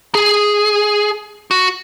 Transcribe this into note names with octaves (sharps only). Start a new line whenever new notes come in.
G#4
F#4